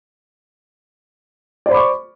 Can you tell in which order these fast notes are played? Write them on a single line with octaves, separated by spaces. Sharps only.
D5 C5 B5 D6 C#6